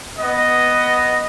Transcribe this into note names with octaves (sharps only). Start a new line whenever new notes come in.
B3 D#5